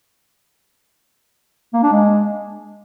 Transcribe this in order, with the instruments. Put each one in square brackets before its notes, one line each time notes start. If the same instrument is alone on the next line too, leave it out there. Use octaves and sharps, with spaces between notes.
[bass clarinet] A#3
D4
G#3